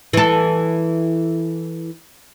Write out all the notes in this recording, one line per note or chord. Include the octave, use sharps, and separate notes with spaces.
E3 A4